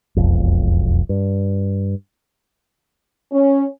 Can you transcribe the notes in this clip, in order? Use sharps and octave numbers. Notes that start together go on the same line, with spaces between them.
E1 B1 F2
G2
C#4